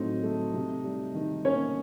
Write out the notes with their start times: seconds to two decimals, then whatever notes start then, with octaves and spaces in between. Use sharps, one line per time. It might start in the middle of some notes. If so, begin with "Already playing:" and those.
Already playing: A2 F#3 C4 D#4
0.23 A3
0.54 C3
0.84 G3
1.14 D#3
1.45 A#3 C#4 C#5